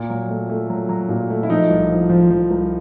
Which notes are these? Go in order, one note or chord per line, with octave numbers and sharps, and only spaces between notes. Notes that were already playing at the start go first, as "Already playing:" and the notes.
Already playing: A#2
F#3
A3
A3
F#3
F#3
A#2
A3
E4
F3 D#4
C2
F3
F3
F3
C2